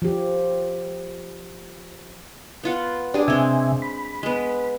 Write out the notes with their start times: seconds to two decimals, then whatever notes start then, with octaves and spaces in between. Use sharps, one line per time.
0.02 F3 G4
2.64 B3 F4 F#5
3.14 D4 G4 G#4 D5
3.28 C3 G#3 C4 E5 G#5
3.82 B5
4.23 G#3 B3